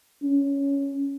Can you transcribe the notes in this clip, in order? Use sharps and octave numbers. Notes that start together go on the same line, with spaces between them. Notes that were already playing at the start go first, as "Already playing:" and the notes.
C#4